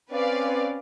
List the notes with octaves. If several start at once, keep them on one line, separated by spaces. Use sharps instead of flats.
C4 C#4 B4 D5 F5